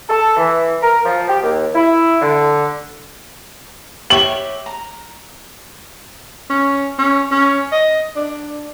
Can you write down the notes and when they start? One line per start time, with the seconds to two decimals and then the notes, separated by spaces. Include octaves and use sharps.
0.09 A4
0.37 E3
0.83 A#4
1.05 F3
1.28 G4
1.43 D#2
1.75 E4
2.21 D3
4.10 G4 C#5 E5 F#7
4.66 A#5
6.50 C#4
6.99 C#4
7.31 C#4
7.72 D#5
8.16 D4